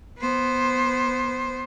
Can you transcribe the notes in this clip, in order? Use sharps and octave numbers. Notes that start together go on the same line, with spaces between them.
B3 C5